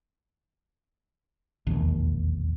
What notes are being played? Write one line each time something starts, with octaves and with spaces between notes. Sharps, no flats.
E1 A#1 D#2